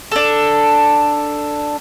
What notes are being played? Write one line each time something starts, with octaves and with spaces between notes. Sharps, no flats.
D4 A4